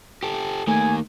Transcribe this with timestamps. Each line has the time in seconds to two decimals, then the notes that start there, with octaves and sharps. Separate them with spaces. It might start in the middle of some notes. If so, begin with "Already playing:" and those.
0.23 G4 A4
0.67 D#3 A3 A#3 G#5